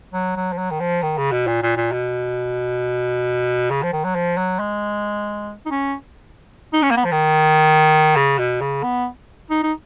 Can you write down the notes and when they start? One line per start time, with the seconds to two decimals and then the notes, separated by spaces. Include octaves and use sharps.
0.13 F#3
0.36 F#3
0.53 F3
0.58 F#3
0.71 D#3
0.80 F3
1.02 D#3
1.18 C#3
1.32 B2
1.47 A#2
1.62 A#2
1.77 A#2
1.92 B2
3.70 C#3
3.83 F3
3.93 D#3
4.04 F#3
4.15 F3
4.37 F#3
4.59 G#3
5.66 D#4
5.71 C#4
6.73 D#4
6.83 C#4
6.91 A#3
6.97 B3
7.05 F3
7.12 D#3
8.16 C#3
8.39 B2
8.61 C#3
8.83 B3
9.50 D#4
9.63 D#4